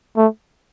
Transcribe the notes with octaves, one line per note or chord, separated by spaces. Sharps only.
A3